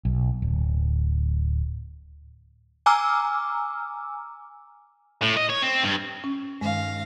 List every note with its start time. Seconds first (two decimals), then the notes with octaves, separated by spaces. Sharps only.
0.05 B1
0.42 D1
2.86 G#5 A#5 D6 E6 F6
5.22 A2
5.37 D#5
5.49 C#5
5.62 C4
5.83 G2
6.24 C#4
6.61 G2 D#3 G#3 F5 A#6